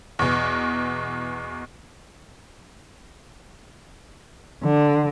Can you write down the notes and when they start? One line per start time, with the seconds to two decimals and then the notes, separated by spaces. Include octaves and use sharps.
0.19 E2 B2
4.64 D3